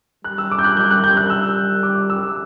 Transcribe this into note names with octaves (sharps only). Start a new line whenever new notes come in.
G3 F#6
E6
D6
G6
F#6
G3 G6
F#6
G6
F#6
E6
D6
E6